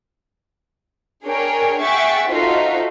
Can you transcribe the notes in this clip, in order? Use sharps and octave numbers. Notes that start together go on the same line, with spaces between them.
D4 G#4 A#4 C#5 G5
G#4 E5 F#5 G5 C#6 A6
D#4 F4 F#4 A4 C5 E5